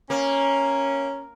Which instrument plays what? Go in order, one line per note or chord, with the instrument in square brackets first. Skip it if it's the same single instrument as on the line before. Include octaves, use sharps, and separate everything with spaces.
[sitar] A#3 [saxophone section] C#4